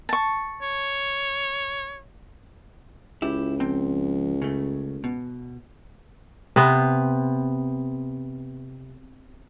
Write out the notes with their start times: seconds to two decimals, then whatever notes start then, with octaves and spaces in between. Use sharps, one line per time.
0.09 A5 C#6
0.62 C#5
3.22 C#2 E4 G4
3.60 F2 C4 G5
4.42 C#3 A3
5.04 B2
6.56 C3 B3